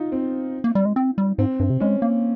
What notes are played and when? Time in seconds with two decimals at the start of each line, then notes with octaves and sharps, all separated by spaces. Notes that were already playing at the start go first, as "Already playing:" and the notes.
Already playing: D#4 F4
0.12 C4
0.64 A#3
0.75 G3
0.85 G#3
0.96 C4
1.18 G3
1.38 G#2 C4
1.60 G2
1.70 C3
1.80 G#3 C#4
2.02 A#3